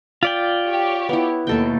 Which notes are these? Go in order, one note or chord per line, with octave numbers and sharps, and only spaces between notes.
F4 D5 G5 B5
G4 C#5
B3 E4
D#2 B2 A3 A4 G5